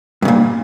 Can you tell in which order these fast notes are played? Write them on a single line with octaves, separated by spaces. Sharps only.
G2 C#3 A#2